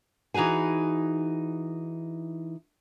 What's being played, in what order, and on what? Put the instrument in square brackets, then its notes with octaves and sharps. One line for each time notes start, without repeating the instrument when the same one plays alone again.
[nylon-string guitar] E3 D#4 F#4 G#4 G#5